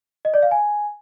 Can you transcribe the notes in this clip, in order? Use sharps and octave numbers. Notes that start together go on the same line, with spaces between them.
D#5
D5
F5
G#5